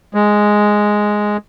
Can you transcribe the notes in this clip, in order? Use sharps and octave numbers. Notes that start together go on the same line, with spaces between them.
G#3